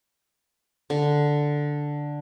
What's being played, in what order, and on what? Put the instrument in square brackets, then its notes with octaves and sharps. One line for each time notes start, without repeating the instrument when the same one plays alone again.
[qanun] D3